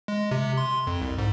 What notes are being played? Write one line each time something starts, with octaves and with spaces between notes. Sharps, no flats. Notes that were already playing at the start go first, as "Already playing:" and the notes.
G#3
C3
C6
F2
C2
G#2